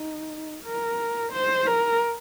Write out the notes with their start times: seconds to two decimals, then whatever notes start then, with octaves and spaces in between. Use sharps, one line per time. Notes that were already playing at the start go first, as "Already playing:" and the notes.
Already playing: D#4
0.63 A#4
1.32 C5
1.66 A#4